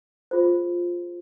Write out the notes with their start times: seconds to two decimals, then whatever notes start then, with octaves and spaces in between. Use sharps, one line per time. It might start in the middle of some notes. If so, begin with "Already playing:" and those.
0.31 F4 G#4 C5